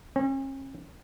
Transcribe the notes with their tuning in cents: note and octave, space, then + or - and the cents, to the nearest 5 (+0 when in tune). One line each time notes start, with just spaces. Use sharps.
C#4 -40